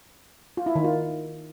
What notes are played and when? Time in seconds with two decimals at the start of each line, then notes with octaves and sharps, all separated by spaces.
0.57 F4
0.66 E4
0.75 D#3
0.84 F4